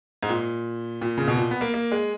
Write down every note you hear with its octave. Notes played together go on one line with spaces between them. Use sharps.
G#2
A#2
A#2
C#3
B2
A#2
B3
A#3
A#3
G#3